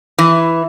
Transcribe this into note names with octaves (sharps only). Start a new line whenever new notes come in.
E3